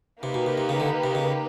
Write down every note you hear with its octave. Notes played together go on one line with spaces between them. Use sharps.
C3 A#3 D#4 G4 B4
B2
C3
C3
C#3
D3
C3
C#3